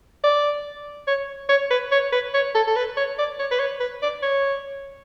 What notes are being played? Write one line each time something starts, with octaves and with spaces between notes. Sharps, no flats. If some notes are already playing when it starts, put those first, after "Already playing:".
D5
C#5
C#5
B4
C#5
B4
C#5
A4
A4
B4
C#5
D5
C#5
B4
C#5
B4
D5
C#5